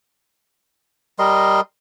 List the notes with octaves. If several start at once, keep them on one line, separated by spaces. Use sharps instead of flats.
G3 A#4 D#5 C6